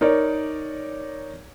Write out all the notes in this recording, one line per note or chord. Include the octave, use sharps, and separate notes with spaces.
D#4 A#4 C#5 D5